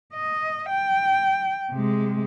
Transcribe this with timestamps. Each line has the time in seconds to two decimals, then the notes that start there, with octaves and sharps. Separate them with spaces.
0.14 D#5
0.69 G5
1.72 C3 G#3